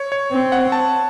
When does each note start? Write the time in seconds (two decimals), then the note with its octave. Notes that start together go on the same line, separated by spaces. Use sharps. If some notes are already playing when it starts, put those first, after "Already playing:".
Already playing: C#5
0.12 C#5
0.33 C4
0.52 F#5
0.72 A5